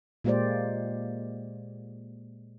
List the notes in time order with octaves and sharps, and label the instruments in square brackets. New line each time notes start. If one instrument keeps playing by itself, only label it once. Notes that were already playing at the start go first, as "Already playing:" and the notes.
[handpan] A#2 G#3 A#3 G4 C5 D5